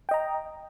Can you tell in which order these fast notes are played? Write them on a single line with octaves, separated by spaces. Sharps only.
G5 D#5 A#5